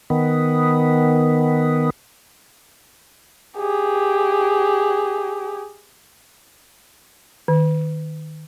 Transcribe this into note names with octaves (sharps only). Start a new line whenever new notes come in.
D#3 B3
G4 G#4
D#3